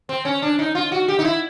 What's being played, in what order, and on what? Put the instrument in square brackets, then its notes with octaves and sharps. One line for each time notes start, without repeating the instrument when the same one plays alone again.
[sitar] C4
C#4
D4
D#4
F4
F#4
G4
D#4
E4